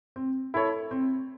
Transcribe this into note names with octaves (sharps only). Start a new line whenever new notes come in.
C4
E4 A4 C#5
C4